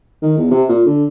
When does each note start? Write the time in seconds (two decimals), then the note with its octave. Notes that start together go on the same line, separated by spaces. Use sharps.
0.22 D#3
0.38 E2
0.51 C3
0.69 A#2
0.86 D3